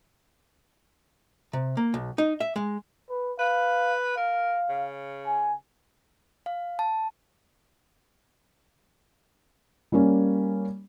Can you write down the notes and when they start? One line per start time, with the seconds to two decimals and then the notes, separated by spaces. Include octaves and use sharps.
1.53 C3
1.77 A#3
1.94 B1
2.18 D#4
2.40 E5
2.56 G#3
3.10 B4
3.39 B4 F5
4.17 A#4 F5
4.69 C#3
5.27 G#5
6.46 F5
6.79 A5
9.92 G3 A#3 C#4